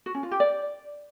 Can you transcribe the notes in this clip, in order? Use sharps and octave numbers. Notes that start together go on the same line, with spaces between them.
F#4
C#4
F4
G4
D5